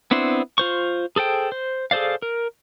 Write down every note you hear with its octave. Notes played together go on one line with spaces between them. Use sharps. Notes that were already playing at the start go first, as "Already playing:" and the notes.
B3 C4 D4 E4 C5
F4 C5 C#6
G#4 A4 C5 G5
C5
G#4 A4 C5 D5 F5
A#4